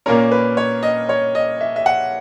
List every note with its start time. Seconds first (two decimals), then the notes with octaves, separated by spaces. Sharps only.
0.06 A#2 A#3 C#4 A#4
0.32 B4
0.57 C#5
0.83 D#5
1.09 C#5
1.35 D#5
1.61 E5
1.76 E5
1.86 F#5